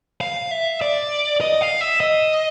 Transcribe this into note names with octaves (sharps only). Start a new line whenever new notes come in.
F5
E5
D5
D#5
F5
E5
D#5